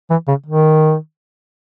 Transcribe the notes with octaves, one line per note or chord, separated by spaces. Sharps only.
E3
C#3
D#3